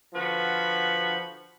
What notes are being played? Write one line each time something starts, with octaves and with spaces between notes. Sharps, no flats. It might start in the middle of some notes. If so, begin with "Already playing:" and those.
D3 F3 F#4 B4 B5